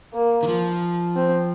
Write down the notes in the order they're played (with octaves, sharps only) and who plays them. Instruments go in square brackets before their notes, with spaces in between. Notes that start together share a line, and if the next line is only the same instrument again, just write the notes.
[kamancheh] A#3
[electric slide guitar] D#3
F3
[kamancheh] C4